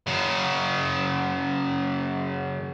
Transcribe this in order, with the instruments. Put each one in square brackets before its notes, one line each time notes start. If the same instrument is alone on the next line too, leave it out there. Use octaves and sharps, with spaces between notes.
[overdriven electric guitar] F#2 C#3